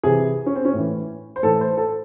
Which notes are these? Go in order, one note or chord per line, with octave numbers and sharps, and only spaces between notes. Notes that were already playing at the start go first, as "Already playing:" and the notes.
C3 E3 G#4
C#4
C4
C#4
A2 E3
C5
A2 E3 A4
C5
A4